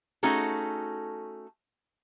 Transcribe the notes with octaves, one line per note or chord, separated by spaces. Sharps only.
A3 C#4 D#4 F#4 G#4 A4